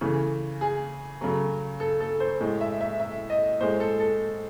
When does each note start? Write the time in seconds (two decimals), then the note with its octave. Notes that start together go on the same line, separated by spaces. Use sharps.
0.01 C#3 E3 A3
0.61 G#4
1.21 C#3 F#3 A3
1.80 A4
2.00 A4
2.20 C5
2.40 A2 G#3
2.61 E5
2.81 E5
3.00 E5
3.30 D#5
3.61 A2 G#3 C5
3.80 A4
4.00 A4